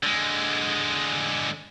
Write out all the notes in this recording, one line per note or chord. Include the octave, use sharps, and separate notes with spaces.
D3 G#3